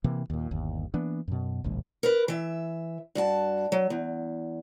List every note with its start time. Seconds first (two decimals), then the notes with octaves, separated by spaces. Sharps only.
0.04 C3 E3 A#3
0.30 D#2 A#2
0.51 G1 D#2
0.94 E3 A#3 B3 D4
1.28 F#2 B2
1.64 E1 A#1 D#2 G#3
2.03 A#4 B4
2.28 E3 E5
3.15 G2 F#4 A5
3.72 F#3
3.90 E2